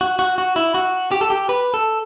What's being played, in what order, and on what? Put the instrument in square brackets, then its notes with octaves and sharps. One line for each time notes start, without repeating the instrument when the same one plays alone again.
[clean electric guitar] F#4
F#4
F#4
E4
F#4
G4
A4
G4
B4
A4